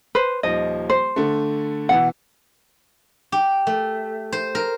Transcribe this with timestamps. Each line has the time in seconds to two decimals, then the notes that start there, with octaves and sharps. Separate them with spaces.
0.15 B4 C5
0.43 D#1 F3 D#4 D#5
0.90 C5
1.16 D3 A3
1.89 B2 E3 F#5
3.32 G4
3.67 A3
4.32 C5
4.55 A#4